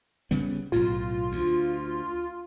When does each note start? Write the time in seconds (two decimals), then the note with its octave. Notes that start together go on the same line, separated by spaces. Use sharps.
0.31 C#3 G3 B3
0.72 B1 A2 F4
1.32 D2